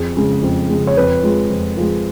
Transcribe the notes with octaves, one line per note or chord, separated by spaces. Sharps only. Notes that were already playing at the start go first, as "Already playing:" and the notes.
Already playing: F2 G#4
C#3 G#3
F2
C#3 G#3
C#5
F2 B4
F3 G#3
F2
F3 G#3